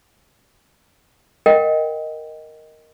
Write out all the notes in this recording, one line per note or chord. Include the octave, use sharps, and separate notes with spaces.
A#4 D#5 F#5 G5